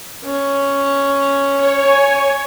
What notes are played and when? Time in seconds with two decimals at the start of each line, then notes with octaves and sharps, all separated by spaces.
0.24 C#4
1.54 C#5
1.87 G#5